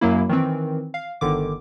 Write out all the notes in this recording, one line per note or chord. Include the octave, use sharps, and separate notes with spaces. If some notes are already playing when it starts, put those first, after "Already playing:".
F#2 F#3 A#3 E4
D#3 E3 C4
F5
G1 D3 D#3 D6